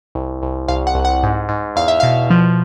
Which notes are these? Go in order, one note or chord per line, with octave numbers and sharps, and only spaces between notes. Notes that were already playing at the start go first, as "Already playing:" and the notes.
C2
C2
C2 F5
F#5
C2
F#5
G#2
G#2
E2 F5
E5
B2 F5
F3